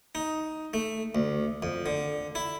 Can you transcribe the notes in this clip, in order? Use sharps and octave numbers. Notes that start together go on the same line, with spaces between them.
D#4
A3
D2
F2
D3
E4